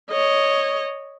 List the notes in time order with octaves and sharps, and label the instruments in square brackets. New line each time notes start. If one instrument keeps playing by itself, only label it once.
[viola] C#5 D#5